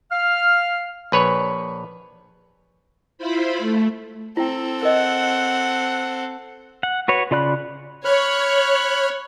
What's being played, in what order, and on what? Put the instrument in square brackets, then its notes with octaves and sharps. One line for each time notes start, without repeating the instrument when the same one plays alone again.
[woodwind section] F5 F6
[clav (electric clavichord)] A#1 B4 C#5
[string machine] E4 F4 C5 B5
A3
[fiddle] C4 A4 [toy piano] E4 G5
[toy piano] A#4 D#5 [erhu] F#5
[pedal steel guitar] F#5
F#4 B4 C#5
C#3 F4 D5 B5 F#6
[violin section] C#5 [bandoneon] B5 F6 F#6